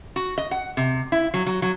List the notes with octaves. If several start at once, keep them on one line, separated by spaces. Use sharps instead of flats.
F#4
D#5
F#5
C3
E4
F#3
F#3
F#3